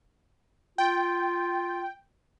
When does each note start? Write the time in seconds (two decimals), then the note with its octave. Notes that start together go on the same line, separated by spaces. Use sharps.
0.78 F4 G5